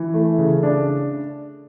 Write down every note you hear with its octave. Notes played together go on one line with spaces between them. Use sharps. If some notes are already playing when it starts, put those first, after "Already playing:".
Already playing: E3
A3
C#3
D4